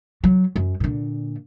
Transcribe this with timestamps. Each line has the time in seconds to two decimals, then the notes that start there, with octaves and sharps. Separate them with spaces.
0.24 F#3
0.56 F#2
0.80 A#2 D3